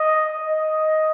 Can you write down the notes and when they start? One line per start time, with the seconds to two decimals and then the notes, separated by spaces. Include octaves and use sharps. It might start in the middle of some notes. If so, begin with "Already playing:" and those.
Already playing: D#5
0.39 D#5